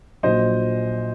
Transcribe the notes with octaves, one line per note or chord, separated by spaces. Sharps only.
A#1 A#2 F#3 C5 D#5